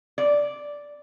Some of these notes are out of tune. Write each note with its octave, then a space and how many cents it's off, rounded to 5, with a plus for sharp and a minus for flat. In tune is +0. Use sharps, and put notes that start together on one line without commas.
D5 -5